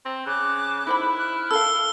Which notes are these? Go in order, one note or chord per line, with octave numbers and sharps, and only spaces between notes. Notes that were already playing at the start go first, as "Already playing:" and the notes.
C4
C#3 D6 F#6
D#4 E4 C5 B5
F6 F#6
F6
A4 A#4 F5 E6 G7